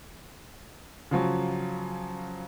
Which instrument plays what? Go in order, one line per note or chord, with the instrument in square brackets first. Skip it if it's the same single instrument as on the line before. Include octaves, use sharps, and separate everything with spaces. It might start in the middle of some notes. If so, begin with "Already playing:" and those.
[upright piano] C#3 F3 F#3